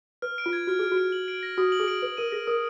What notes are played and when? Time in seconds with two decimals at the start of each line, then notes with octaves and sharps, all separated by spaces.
0.22 B4 F6
0.38 D7
0.46 F4
0.53 G#6
0.67 F#4 F6
0.79 G#4 F6
0.92 F#4
0.98 D7
1.12 F#7
1.28 D7
1.43 A#6
1.58 F#4 D#6
1.72 F#7
1.80 G#4
1.88 D7
2.02 B4 F#7
2.17 A#4 D#7
2.32 G#4 A#6
2.47 A#4 D#6